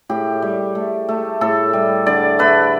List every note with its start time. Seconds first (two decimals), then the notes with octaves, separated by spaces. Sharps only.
0.09 A2 G4
0.42 G3
0.75 A3
1.09 A3
1.41 A2 A4
1.73 G3
2.06 D3 D5
2.39 A3 B4